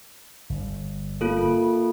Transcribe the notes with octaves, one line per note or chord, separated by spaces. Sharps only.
G1
A#3 F4 A4